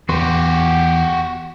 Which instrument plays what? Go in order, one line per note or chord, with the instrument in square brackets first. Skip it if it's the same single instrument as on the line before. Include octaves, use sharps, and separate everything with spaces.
[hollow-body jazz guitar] E2 B4 C6 [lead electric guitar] F#4 G4